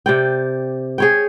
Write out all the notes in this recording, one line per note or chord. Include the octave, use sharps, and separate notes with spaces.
C3 D5 G5
G#4 C#5 G5